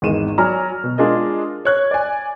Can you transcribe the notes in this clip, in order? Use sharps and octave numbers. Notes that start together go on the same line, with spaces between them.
G#1 E2 D#3 G#3 D#7 E7
F#3 D5 G#5 A#5 F6
B2
G#3 D4 F4 G#4 A#4 D#5
C#5 F#6 G#6
D5 G#5